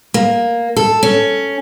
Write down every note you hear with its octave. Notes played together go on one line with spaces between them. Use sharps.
A#3
A4
C#4